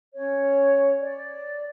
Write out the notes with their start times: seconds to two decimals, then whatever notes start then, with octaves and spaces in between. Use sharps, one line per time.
0.15 C#4 C#5
1.00 D5